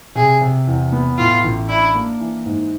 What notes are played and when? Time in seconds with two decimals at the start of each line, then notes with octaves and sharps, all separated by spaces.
0.15 C3 G#4
0.41 C3
0.67 E2
0.92 B3
1.18 A2 F4
1.44 A1
1.69 D4 E4
1.95 A#3
2.20 E3
2.46 G#2